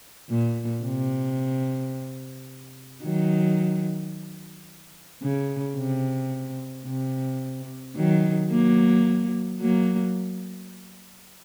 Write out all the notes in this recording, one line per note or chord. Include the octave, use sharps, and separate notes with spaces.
A#2
C3
D#3 F#3
C#3
C3
C3
D#3 F#3
F#3 A#3
F#3 A#3